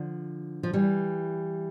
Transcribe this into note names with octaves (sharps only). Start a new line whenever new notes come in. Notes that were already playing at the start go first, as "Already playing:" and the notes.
Already playing: D3 F3
F3
E3 G3